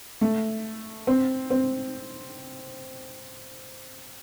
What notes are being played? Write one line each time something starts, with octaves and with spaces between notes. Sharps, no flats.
A3
C4
C4